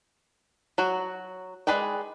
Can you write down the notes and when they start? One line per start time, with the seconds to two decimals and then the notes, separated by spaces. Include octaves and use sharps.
0.78 F#3 F#4
1.67 G#3 G#4 B4 D5 G5